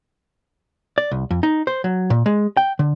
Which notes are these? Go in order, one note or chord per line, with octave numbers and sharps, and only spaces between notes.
D5
C2
F2
D#4
C5
F#3
A#2
G#3
G5
D3